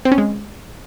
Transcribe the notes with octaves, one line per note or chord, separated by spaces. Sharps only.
C4
C#4
G#3